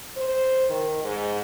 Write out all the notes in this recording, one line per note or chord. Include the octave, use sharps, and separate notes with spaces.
C5
D#3
G#2